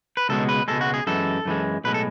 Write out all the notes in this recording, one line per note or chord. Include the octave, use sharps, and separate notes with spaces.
B4
C#2 B2 G#3 A4
B4
C#2 B2 G#3 A4
F#4
G#4
F#2 E3 G#3 A4
F#2 E3 G#3
B1 A2 G#3 B4
A4